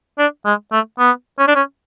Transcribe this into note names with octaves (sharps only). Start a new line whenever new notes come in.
D4
G#3
A3
B3
C#4
D4
C#4